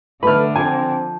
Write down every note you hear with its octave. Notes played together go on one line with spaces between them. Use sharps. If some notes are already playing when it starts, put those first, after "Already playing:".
D3 A3 A4 B4 B5 F6
F3 C4 G#5